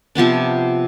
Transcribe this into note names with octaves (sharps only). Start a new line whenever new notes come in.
C3 F3 B3 D4